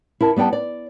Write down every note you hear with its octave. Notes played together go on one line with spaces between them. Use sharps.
E4 A#4 A5
G3 B3 D5 G5 A5
D5